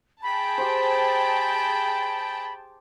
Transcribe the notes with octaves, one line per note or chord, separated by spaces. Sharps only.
G#4 G5 A5 B5
G4 C5